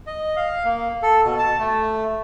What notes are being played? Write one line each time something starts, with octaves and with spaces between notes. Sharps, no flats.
D#5
F5
A#3
A4
B2
A5
A3